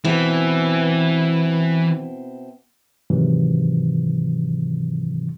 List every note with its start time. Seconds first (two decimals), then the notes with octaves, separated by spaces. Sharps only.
0.04 B2 E3 C4 E4
3.10 G#2 C3 D#3 E3 F#3